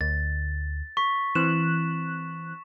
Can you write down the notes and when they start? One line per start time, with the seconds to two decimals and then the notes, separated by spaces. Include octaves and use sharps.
0.01 D2 A6
0.97 C#6 B6
1.35 E3 C4 F#6 E7